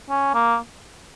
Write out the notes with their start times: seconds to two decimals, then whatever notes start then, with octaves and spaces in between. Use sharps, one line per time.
0.10 C#4
0.34 A#3